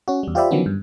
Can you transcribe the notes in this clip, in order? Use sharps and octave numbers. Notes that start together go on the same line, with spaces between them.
C#4 F#4
E2 G3
F4 G4 C5 D5 E5 B5
D3 D#3 F3 F#3 B3 C#4
G2